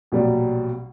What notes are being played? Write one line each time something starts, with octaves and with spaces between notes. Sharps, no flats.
A#1 B2 F#3 G3